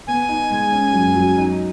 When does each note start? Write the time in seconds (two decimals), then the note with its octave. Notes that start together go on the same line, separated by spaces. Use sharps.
0.07 B3 G#5
0.29 D#4
0.50 G#3
0.72 C#4
0.93 F#2
1.15 F#3
1.38 D#4